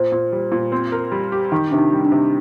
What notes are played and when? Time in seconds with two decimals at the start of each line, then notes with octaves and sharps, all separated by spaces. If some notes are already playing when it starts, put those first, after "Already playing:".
Already playing: A#2 C5
0.12 A#2
0.32 G3
0.52 A#2
0.72 C4
0.92 A#4
1.12 G3
1.32 G4
1.52 D#3 D#4
1.71 C3 D4
1.78 D#4
1.92 G3
2.05 D4
2.12 C3